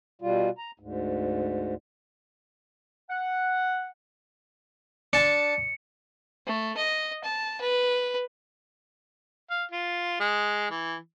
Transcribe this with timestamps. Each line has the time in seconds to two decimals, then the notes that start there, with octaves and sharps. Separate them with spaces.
0.22 B2 G3 F4
0.58 A#5
0.80 D2 G#2
3.10 F#5
5.13 D4 A5 C#7
6.46 A3
6.77 D#5
7.24 A5
7.61 B4
9.51 F5
9.72 F4
10.20 G#3
10.71 E3